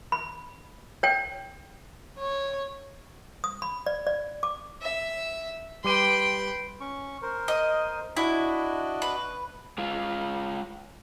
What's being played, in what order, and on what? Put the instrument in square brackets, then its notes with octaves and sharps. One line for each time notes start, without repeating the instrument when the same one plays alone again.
[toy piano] B5
C#5 G5
[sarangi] C#5
[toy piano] D#6
B5
D5
D5
D6
[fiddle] E5
[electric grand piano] G3 D6 D#7 [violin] B4 G5 [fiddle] C6
[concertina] C#4 C#6
A#4 C5
[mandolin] D#5
[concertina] D4 F#4 D#5 [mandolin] E4
[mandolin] B4
[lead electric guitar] G#3 F4